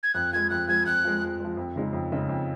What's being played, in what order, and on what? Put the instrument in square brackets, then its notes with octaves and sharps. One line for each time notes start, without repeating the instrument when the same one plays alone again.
[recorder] G#6
[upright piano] F2 [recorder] F#6
[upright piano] F3 G#3 [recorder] G#6
[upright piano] F2 [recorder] F#6
[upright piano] F3 G#3 [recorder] G#6
[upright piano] F2 [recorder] F#6
[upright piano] F3 G#3
F2
F3 G#3
F2
C#3 G#3 D#4
F2
C#3 G#3 D#4
F2